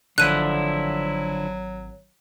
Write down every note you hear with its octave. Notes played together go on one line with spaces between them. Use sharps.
G#1 D3 F3 F#3 E4 F#6 D#7